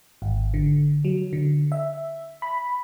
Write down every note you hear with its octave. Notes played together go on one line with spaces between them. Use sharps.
G#1
D3
F#3
D3
E5
B5